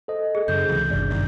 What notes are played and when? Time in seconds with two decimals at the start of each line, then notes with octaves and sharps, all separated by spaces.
0.08 A4 C5 D#5
0.35 G#4
0.48 F#2 C#3 G6
0.68 C#2 C3 E3
0.91 G#1 G2 D5
1.10 F#2 B2 D#3